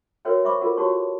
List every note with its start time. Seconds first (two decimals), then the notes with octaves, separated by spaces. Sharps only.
0.25 F#4 A#4 B4 C#5 E5 G5
0.44 C5 E5 B5 C#6 D6
0.61 F4 A4 A#4 F#5
0.77 F#4 G4 C#5 A5 C#6